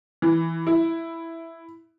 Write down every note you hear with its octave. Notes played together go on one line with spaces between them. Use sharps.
E3
E4